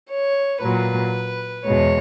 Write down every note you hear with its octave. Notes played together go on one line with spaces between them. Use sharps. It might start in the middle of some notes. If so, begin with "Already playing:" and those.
C#5
A#2 F#3 B4
E2 B2 G#3 C#5